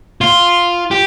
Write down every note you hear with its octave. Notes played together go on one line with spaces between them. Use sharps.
F4
G4